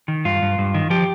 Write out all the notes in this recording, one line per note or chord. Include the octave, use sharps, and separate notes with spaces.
D#3
G2 F4
G2
G2
D#3
F3 G4